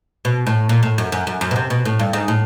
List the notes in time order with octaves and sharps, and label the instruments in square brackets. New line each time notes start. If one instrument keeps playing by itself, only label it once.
[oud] B2
A2
A#2
A2
F#2
F#2
F#2
F#2
B2
C3
B2
A2
G2
G#2
A2